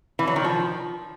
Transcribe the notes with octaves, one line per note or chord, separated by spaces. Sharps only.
E3
F#3
D#3
F3